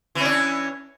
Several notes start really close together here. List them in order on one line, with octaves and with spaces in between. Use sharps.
E3 C#4 D4